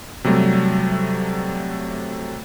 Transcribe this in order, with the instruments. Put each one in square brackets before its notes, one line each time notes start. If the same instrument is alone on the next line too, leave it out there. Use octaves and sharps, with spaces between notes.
[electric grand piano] C3 F#3 G3 A3